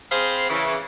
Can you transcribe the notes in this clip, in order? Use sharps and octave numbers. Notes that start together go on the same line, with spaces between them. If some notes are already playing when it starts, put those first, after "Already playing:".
C4 G#4 C5 F5 B5
C#3 E3